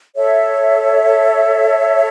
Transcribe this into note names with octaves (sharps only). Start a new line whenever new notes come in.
A4 C#5 E5